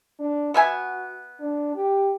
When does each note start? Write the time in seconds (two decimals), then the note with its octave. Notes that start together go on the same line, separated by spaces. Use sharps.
0.20 D4
0.54 B3 F#4 E5 G#5
1.40 D4
1.75 G4